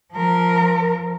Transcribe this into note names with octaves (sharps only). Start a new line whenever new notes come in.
F3 A#4